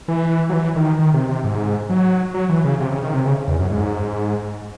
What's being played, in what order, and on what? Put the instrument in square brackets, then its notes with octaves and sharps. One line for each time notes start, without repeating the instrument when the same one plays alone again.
[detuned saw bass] E3
F#3
E3
D#3
D#3
C3
C3
G#2
F#3
F#3
E3
C#3
C3
C#3
D#3
C3
C#3
E2
F#2
G#2